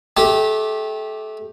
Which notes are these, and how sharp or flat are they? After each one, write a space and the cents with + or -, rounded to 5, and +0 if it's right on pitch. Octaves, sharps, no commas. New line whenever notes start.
A3 -30 G4 +0